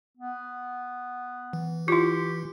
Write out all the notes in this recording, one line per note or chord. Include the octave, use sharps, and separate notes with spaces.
B3
E3
E4 F4 G4